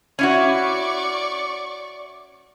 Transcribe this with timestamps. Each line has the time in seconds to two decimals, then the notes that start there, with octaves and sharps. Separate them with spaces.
0.19 C#4 E4 F#4 D5 C#6